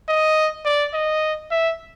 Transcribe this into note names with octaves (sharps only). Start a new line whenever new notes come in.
D#5
D5
D#5
E5